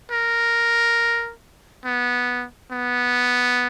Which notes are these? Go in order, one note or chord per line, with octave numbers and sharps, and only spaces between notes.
A#4
B3
B3